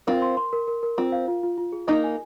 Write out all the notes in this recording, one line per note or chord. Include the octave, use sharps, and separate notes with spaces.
C4 F4 A#4
C6
C6
A#4
A#4
A#4
C4 F4
F5
F4
F4
F4
G#4
A#3 D#4 D#5
G#5